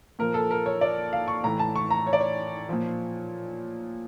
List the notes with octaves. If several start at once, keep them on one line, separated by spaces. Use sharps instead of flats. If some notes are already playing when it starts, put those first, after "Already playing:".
A#2 F3 A#4
A4
A#4
C#5
D5
F5
C#6
A2 E3 A#5
A5
C#6
A#5
C#5
D5
C#5
A#2 F3